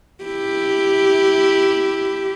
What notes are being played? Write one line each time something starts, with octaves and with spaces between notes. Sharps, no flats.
E4 G4